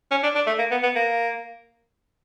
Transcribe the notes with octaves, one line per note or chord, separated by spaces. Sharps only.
C#4
D4
D4
A3
A#3
B3
B3
A#3